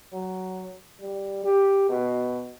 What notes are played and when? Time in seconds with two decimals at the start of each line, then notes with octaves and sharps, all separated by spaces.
0.13 F#3
1.01 G3
1.44 G4
1.89 B2